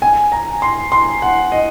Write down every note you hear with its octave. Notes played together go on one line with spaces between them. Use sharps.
G#5
A#5
C6
C6
F#5
D#5